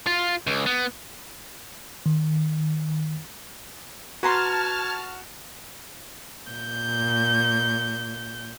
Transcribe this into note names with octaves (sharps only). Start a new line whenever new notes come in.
F4
C#2
B3
D#3
F#4 B4 A5 A#5 C6 F6 G#6
A#2 G6